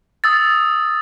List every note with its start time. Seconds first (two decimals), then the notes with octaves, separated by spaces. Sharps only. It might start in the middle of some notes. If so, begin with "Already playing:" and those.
0.24 D#6 E6 A6